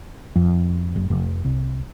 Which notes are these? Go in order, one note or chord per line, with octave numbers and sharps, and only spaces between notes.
F2
F#1
F1
C2